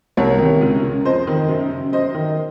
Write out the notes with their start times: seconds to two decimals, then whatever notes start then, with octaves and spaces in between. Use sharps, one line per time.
0.17 C2 A#4 C#5
0.39 C3 D#3
0.61 C#2
0.83 C#3
1.05 F2 C5 D#5
1.27 D#3
1.49 F#2
1.71 C#3
1.93 F#2 C5 D#5
2.15 D#3